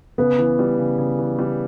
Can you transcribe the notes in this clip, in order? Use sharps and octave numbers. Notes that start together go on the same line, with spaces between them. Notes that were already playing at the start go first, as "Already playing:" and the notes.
C#3 B3
E3
G3
C#3
C#3
E3
G3